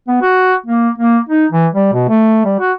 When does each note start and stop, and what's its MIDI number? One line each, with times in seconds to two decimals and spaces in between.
0.08 0.17 59
0.22 0.54 66
0.66 0.89 58
0.98 1.18 58
1.29 1.45 63
1.52 1.67 52
1.74 1.89 55
1.93 2.08 47
2.09 2.44 57
2.45 2.55 55
2.60 2.72 66